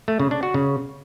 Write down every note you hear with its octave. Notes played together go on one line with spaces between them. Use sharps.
A3
C#3
D4
F#4
C#3